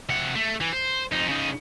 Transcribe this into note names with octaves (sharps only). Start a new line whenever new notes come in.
C3 F#5
A3
E3
C5
F2 D#4
C#3 D#4